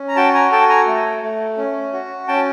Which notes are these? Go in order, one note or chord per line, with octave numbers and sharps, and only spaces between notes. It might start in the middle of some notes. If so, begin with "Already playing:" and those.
Already playing: C#4
A#5
F#4 G5 A5
G#5 A#5
A4 G5 A5
G#5 A#5
A3
A3
C#4
F#4
C#4 G5 A5